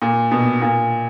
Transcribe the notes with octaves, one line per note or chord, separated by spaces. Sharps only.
A#2
B2
A#2